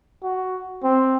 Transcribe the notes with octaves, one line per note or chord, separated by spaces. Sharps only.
F#4
C4